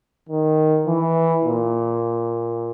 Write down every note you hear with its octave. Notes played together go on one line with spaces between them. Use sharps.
D#3
E3
A#2